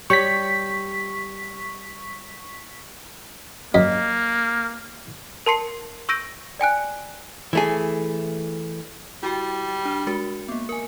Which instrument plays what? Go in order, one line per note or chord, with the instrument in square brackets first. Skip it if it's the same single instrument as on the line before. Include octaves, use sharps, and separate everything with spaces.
[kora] G3 G4 C#5 [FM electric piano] C#6 B6
[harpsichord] F#2 [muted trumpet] A#3 [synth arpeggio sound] D#5 B6
[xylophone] A#4 A5 C6 C7 C#7
C#6 E6 G6 A#6 D7 D#7
D5 G5 G#5 F#6
[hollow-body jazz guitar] E3 A3 G#4
[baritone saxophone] G3 [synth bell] E4 F#4 G5
[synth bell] D4
G#3 F#4 A#4
A#3 B3
A#4 G#5